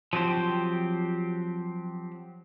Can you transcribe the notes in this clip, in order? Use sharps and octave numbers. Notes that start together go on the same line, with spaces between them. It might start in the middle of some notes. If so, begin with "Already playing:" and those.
F3 F#3 C4 G4 C5